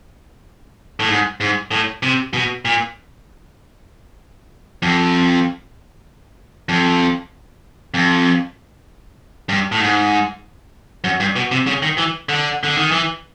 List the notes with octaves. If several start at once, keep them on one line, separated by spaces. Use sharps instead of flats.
A2
G#2
G#2
A2
C3
B2
A#2
F2
F2
F2
G2
A2
G#2
F#2
G2
B2
C3
C#3
D#3
E3
D3
D3
D#3
E3